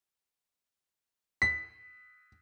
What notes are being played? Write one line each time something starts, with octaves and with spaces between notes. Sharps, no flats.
B6